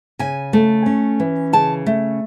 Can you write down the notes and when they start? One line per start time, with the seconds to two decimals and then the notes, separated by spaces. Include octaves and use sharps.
0.19 C#3 G#5
0.53 A3
0.86 C#4
1.20 E3
1.53 C#3 A5
1.86 A3